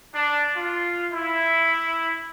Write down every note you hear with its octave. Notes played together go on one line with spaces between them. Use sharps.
D4
F4
E4